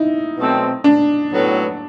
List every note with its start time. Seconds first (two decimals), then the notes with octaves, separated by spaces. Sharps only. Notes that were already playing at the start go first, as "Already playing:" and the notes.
Already playing: D#4 E4
0.37 B2 F#3 A3 C4
0.84 D4
1.32 A2 F#3 B3